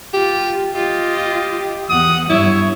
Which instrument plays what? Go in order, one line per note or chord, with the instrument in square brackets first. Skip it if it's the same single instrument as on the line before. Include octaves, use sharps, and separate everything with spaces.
[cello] F4 [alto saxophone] G4
[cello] F4 [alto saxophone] G4 [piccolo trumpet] D#5
[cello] E2 F#5 [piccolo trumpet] D#6
[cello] G2 G3 [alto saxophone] E4 [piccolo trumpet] C#5